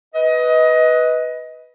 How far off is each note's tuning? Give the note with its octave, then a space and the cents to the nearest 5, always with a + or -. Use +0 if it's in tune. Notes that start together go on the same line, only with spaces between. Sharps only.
B4 +0 D#5 +20